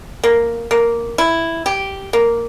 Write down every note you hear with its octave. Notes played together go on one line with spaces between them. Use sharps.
A#3
A#3
E4
G4
A#3